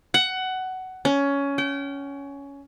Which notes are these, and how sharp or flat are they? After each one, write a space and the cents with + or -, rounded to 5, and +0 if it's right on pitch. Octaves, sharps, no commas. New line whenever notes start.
F#5 +15
C#4 +15
G5 -35